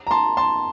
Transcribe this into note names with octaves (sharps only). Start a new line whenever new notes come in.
A#5
A5 C6
A5 C6